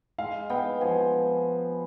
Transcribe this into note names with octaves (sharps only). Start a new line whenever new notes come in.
G#3 F5
B3 G5
F3 G#5